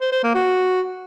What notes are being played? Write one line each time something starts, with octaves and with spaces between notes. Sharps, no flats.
C5
C5
A#3
F#4